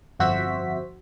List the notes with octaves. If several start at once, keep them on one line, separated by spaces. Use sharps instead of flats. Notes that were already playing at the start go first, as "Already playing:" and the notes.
G1 F2 F#4 C5 E5 B6